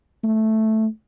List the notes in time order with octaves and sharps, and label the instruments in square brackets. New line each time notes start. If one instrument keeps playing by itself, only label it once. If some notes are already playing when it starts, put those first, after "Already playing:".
[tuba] A3